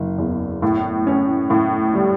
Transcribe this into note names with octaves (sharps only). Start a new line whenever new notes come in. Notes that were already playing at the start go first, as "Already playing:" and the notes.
Already playing: F#1
E2
A2
C#4
A2
G3